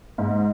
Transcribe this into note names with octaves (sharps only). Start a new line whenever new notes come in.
G#2